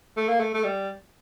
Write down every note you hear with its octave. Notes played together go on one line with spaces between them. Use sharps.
A3
A#3
A3
A3
G3